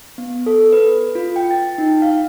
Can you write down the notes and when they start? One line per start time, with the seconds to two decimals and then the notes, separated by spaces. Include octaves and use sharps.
0.18 B3
0.46 A4
0.73 B4
1.15 F4
1.36 G5
1.51 A6
1.78 D#4
2.02 F5